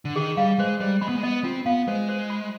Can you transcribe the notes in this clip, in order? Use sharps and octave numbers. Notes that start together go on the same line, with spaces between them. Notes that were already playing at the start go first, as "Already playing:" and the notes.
D3
D#3 G#4
G3 F5
G#3 C5
G3 C5
G#3 B5
B3
G#3
B3 D#5
C4 F4
B3 F5
G#3 C5
C5
B5